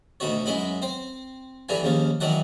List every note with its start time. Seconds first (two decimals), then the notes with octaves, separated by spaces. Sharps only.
0.20 D2 B2 D#4 F#4 C#5
0.46 F#2 G#3 B3 E4 B5
0.82 C4 C5
1.69 E2 G2 D3 E3 D4 G#5
1.83 D#2 C#3 F3
2.20 D#3 E3 F#3 D4 F#5